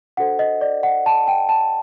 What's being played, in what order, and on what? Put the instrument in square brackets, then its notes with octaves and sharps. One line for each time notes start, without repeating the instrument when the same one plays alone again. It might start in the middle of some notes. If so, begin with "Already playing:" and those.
[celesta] D4 F#4 A4 C5 F#5
D#5
D5
F#5
A5
G5
A5